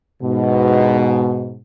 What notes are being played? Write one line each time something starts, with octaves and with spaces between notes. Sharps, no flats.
G#2 B2